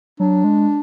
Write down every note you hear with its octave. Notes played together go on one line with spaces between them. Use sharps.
F#3 D4
G#3